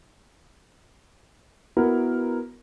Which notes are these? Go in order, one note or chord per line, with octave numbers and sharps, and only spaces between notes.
B3 E4 F#4 A#4